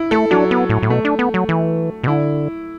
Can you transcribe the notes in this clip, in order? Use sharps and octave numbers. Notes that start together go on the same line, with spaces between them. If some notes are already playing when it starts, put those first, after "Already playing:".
Already playing: E4
A3 A4
F#3 D4
B3
A2
A2
B2 A3
D4
B3
F#3
E3
B2
D3 E4